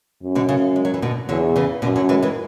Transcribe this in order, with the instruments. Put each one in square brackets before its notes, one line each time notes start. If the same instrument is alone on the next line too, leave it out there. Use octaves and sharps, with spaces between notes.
[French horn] F#2
[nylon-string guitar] B2 D3
C#3
G#3
F#3
E3
B2 D3
[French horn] E2 [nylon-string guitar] D3 F#3
[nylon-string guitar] C#3 E3
[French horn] F#2 [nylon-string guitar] B2 D3
[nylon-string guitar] D3 F#3
E3 G#3
E3 G#3